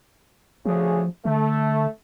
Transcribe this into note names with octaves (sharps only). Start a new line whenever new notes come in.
D2 C#3 F3 G#4
D3 A3